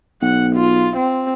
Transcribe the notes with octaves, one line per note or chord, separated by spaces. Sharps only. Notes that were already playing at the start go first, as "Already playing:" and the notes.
B1 F#5
F4
C4